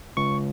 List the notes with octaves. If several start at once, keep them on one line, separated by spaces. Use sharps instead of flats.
C#2 C#6